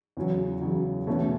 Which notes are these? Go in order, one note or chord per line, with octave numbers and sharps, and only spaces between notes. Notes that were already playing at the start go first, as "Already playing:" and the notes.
E2 C#3 F#3
E2 C#3 F#3
E2 B2 A3 C#4 F#4